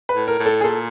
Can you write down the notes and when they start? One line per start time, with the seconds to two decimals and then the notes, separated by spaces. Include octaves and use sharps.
0.09 B4
0.15 A2
0.28 A#4
0.39 A2
0.46 A4
0.61 G#4
0.64 A#2 A4